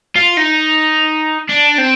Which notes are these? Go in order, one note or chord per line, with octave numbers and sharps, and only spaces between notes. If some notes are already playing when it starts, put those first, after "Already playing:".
F4
D#4
D4
C4